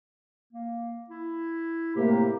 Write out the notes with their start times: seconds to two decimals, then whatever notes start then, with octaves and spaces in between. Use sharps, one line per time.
0.53 A#3
1.10 E4
1.96 A2 C3 A#3 G4